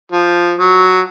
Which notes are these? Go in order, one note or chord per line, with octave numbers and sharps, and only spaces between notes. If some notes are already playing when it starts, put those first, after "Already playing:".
F3
F#3